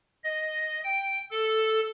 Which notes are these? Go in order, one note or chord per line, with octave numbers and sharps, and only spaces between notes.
D#5
G5
A4